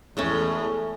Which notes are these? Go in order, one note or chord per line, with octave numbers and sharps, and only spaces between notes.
E2 A2 G#3 A3 C#4